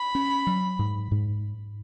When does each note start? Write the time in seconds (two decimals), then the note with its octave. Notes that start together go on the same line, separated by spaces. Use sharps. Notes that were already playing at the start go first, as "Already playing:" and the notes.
Already playing: B5
0.15 C#4
0.47 F#3
0.79 G#2
1.12 G#2